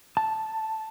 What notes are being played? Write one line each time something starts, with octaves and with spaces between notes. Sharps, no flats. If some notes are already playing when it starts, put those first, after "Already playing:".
A5